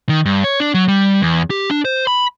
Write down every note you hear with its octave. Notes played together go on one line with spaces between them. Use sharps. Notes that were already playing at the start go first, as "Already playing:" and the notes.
D#3
G2
C#5
D4
F#3
G3
E2
G4
D4
C5
B5